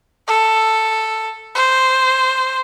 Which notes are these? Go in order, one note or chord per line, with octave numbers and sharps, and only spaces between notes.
A4
C5